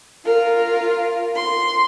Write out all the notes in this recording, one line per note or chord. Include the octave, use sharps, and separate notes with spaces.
F4 A#4
C6